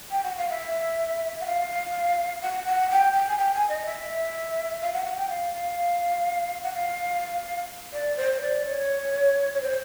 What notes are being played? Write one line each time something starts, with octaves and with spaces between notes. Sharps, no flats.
G5
F#5
F5
E5
F#5
F5
F#5
F#5
G5
G5
G#5
G5
G#5
D#5
E5
F5
F#5
F#5
G5
F5
F5
F#5
F5
D5
C5
D5
C#5
C#5
C5